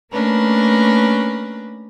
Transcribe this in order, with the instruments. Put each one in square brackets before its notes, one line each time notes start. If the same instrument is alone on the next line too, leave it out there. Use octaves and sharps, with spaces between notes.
[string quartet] A3 A#3 C#4 D4 A#4 B4